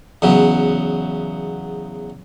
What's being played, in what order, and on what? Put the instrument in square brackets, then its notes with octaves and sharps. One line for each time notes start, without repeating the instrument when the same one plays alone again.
[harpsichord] E2 C#3 F#3